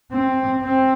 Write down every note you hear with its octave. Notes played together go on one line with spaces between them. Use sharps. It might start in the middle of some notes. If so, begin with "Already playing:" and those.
C4
C4